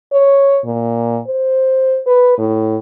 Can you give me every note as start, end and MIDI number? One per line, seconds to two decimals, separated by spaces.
0.12 0.60 73
0.65 1.20 46
1.27 2.01 72
2.07 2.35 71
2.38 2.77 45